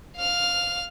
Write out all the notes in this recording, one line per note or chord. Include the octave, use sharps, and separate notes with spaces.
F5 F6